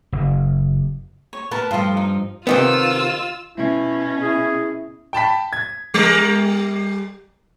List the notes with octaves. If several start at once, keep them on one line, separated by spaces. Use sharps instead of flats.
F#1
C#5
B3 A#4 B4 A5
G2 F3 F4 A4
D#4
C3 D#3 B3 F4 E6
B2 C#4 E4
E4 G#4
G5 A5 B5 B6
G#6
G3 A#4